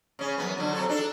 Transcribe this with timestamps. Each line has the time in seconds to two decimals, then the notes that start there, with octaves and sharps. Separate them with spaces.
0.19 C#3 C#4
0.38 F#2 C3 B3
0.58 D3 F#3
0.73 C3 F#3 A4
0.89 D4 A4